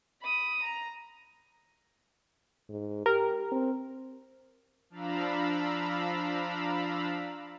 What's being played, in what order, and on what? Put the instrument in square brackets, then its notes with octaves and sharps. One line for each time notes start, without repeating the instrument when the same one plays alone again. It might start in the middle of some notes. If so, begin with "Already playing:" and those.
[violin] B5 D#6
A#5
[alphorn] G#2
[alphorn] G4 [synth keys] A#4
[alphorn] C4
[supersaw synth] F3 D4 F5 A#5 B5 E6